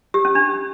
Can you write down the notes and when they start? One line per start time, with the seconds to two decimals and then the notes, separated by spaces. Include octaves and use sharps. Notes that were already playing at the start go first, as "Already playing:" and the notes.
0.14 G4
0.25 C#4
0.35 D4